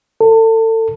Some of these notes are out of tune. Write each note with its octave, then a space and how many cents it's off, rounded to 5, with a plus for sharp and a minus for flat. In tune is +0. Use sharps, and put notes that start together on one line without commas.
A4 +30